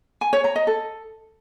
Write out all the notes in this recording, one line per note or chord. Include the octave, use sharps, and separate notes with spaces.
G#5
C#5
A#5
D#5
A4